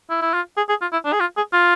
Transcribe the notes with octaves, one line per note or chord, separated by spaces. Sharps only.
E4
E4
F4
G#4
G#4
F4
E4
D4
G#4
F4
G#4
F4